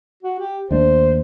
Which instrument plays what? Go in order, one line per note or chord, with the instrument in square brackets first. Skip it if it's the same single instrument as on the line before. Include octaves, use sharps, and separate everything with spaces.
[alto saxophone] F#4
G4
[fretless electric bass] D#2 A3 D4 [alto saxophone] C5